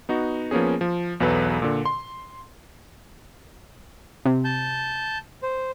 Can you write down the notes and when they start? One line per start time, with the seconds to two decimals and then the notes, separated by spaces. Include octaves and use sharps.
0.09 B3 D#4 F#4
0.51 F3 A#3 B3 C#4 G#4
0.81 F3
1.20 B1 E2 F#3 A4 B4
1.62 A#2 D3
1.85 C6
4.25 C3
4.44 A5 G6
5.43 C5